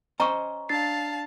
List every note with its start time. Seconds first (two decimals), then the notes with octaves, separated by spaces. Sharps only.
0.20 C#4 C5 D#5 A#5 C#6
0.69 D4 F5 A5 A6 C7